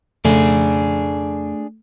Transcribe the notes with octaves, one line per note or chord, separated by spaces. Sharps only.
F2 C#3 A3 D4 G#4